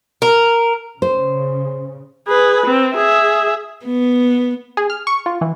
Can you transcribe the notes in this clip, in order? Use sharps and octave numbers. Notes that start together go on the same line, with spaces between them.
A#4
C#3 C5
G#4 B4
C4
G#4 E5
B3
G#4
F6
C#6
F4
E3